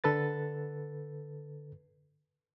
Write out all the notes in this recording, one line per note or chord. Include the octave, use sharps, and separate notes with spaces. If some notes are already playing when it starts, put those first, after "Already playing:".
D3 A4 B4 A6